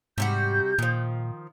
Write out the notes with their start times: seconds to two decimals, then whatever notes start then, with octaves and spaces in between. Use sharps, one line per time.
0.18 G#2 C3 G3 F#4 G6
0.79 A#2 D#3 F3